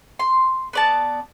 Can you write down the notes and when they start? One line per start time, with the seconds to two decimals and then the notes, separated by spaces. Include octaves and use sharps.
0.19 C6
0.73 B3 D5 A5